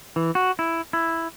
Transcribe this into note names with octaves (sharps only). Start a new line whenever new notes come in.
E3
F#4
E4
E4